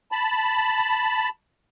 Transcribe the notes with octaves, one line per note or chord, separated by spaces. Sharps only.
A5 B5